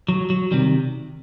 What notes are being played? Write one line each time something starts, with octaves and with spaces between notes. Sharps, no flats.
F#3
F#3
C3 D#3 G3